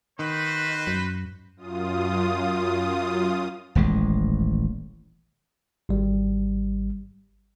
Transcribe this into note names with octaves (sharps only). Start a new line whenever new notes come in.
D#3 F#4 B4 C5
F#2
F#2 F4 D#6
D#1 A1 G#3
G#1 G3